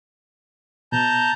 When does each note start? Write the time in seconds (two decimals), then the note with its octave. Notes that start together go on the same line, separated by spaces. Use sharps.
0.92 B2 A5 A#5 G6